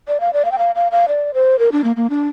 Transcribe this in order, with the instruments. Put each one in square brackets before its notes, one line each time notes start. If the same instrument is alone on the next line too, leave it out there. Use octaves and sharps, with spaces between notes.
[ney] D5
F5
D5
F5
G5
F5
F5
F5
D5
C5
A#4
D4
A#3
A#3
D4